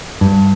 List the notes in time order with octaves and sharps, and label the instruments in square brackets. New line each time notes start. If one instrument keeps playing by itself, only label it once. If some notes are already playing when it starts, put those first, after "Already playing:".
[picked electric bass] G2